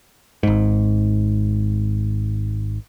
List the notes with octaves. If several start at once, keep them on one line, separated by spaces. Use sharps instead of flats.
G#1 G#2